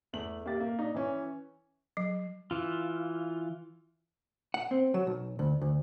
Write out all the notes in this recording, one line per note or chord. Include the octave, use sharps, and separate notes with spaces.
E2 A3 F#7
A#3 G4 E5 A6
A#3
D4 D#4
E3 C#4
F#3
E3 F4
F#5
C4
F#3
B1
D2
D2